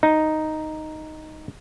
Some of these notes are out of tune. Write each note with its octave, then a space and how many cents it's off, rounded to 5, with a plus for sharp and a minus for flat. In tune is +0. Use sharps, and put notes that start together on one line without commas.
D#4 +0